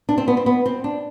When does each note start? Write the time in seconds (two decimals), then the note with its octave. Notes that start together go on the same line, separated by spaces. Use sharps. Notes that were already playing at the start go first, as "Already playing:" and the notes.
0.09 D4
0.18 C4
0.28 B3
0.37 C4
0.46 B3
0.66 C4
0.84 D4